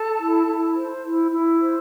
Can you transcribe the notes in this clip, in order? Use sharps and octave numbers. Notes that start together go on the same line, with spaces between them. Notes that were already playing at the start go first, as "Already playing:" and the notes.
Already playing: A4 A5
E4
E4
C5
E4
E4
C5